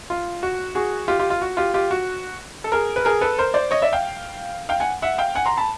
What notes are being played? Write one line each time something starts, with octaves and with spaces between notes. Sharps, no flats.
F4
F#4
F#4 G#4
F4 G4
F4 G4
F4
F#4
F4 G4
F4 G4
F#4
A4
G#4 A#4
B4
G#4 A#4
A4 B4
A#4 C5
C5 D5
C#5 D#5
D5 E5
F5 G5
F5 G5
F#5 G#5
E5 F#5
F5 G5
F#5 G#5
A#5 C6
A5 B5